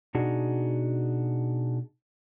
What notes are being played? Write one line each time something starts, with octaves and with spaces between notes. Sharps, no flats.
B2 D4 D#4 F#4 G#4